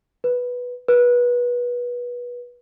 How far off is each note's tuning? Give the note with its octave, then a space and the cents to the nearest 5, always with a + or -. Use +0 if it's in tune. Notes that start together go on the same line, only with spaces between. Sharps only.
B4 -5
B4 -25